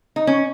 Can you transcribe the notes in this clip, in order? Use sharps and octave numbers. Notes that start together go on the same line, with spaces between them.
D#4
C#4